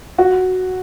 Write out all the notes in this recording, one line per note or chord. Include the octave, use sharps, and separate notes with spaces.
F#4